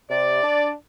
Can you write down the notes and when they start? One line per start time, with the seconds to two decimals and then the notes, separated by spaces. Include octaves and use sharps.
0.10 C3 D5
0.43 D4